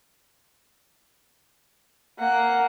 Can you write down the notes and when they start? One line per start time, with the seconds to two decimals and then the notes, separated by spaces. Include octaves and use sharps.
2.19 A#3 F#5